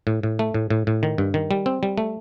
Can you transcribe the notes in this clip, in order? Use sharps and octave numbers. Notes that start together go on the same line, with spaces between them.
A2
A2
A3
A2
A2
A2
D#3
G2
D#3
G3
C4
G3
A3